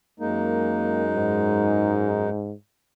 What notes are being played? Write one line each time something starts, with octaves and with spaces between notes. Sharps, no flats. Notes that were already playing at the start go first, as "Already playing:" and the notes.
F#2 G#3 A#3 D#4
G#2